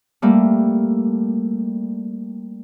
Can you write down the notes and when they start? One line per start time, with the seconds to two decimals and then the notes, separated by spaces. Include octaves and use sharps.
0.22 G3 A3 A#3